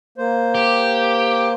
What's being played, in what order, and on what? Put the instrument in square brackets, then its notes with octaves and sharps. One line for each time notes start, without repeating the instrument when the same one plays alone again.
[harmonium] A#3 C5
[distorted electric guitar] G4